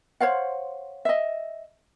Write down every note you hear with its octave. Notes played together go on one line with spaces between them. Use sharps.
C5 C#5 F5 F#5
D#5 E5